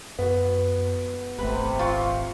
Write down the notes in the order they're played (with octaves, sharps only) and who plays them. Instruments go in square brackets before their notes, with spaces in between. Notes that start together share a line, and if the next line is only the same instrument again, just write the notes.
[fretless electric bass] F#2 [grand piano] B3 F#4
[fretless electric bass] D#1 G#1 A3 [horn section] C3 [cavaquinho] B4
[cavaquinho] F4 [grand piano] F5 C#6